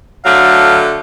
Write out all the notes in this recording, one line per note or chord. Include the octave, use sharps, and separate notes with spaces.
D3 F#3 A3 F5